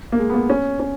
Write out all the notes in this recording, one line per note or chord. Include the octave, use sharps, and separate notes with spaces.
A#3
G#3
B3
A#3
C#4
C#4